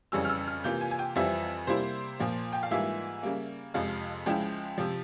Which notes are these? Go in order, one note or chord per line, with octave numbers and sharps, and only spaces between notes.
F2 C#3 E3 G3 C#4 E6
F6
E6
F6
C3 E3 A#3 F4 G6
G#5
G#5
G5
F2 E3 G3 C4 F4 E5
C3 G3 A#3 E4 C5
A#2 F3 A#3
G5
F5
G#2 E3 G3 A#3 F4 E5
C#3 G3 A#3
F2 C3 F3 G#3 F5
C#2 C#3 F3 G#3 E4 G5
C3 F3